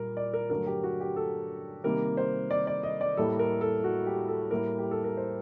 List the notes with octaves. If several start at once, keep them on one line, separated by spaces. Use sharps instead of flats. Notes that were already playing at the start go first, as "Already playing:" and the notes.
Already playing: A#2 G3 A#3 A#4
D5
A#4
G2 D3 F#3 A3 A#4
G4
F#4
G4
A4
C3 D#3 G3 A#3 A#4
C5
D5
D5
D#5
D5
A2 G3 A#3 A4
A#4
A4
F#4
G4
A4
A2 G3 A#3 A#4
G4
A4
A#4
C5